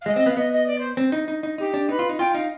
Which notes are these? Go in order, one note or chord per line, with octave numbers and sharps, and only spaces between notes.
F5
G#3 D#5
C4 D#5
B3 F5
B3 D#5
D#5
D5
C5
C4
D#4
D#4
D#4
D#4 G4
D4
D#4 B4
F4
D#4
F4 G5
D#4 F5